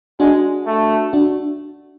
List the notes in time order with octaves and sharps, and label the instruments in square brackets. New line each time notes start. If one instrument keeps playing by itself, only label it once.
[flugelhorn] G#3 [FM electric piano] D4 F#4
[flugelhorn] A3
[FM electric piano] D4 F#4